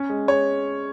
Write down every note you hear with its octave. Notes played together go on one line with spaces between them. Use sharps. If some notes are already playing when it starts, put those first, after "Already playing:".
Already playing: C#4
G#3
G#3 C#5